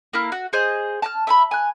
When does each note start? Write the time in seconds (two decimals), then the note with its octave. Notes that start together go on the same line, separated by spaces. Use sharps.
0.13 A#3 E4 F6
0.32 F#4
0.53 G#4 C5 D#5
1.02 A5 A#5 F6
1.27 E5 A5 B5
1.51 G#5 F#6